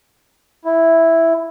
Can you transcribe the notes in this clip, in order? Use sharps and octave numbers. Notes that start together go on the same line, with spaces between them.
E4